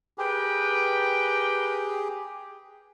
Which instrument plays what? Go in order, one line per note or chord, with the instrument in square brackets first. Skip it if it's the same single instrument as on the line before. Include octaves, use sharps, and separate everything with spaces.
[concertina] G4 G#4 [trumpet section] A#4 B4 G5